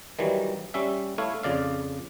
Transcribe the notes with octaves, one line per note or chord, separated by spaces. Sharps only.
D#3 E3 F#3 G3
G3 C#4 E5
A3 E4 C#5 F5
F2 C#3 D5 F5